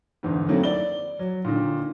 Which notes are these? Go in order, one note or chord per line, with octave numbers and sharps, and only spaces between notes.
G1 E2 G#2
D#3 F#3 A3 A#3 C4 E4
D5 G7
F#3
A#2 D3 D#3